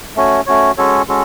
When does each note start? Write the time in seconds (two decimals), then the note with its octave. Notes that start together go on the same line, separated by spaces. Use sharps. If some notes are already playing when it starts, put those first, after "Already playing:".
0.16 A3 C#4 F#4 C#5
0.47 A3 C#4 F#4 C#5
0.77 G#3 C#4 F#4 A4 C#5
1.08 G#3 C#4 F#4 A4